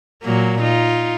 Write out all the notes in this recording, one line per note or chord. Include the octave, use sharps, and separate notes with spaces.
A#2 F#3 A#3
D#4 F4